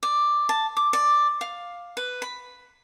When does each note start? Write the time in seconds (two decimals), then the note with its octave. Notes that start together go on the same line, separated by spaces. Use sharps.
0.03 D5
0.49 A5
0.77 D6
0.93 D5
1.41 F5
1.97 B4
2.22 B5